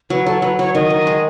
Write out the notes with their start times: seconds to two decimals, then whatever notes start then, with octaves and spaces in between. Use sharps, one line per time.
0.10 F#3 B4
0.26 F#3 A4
0.42 F#3 B4
0.59 F#3 C#5
0.74 D#3 D#5
0.90 D#3
1.07 G#3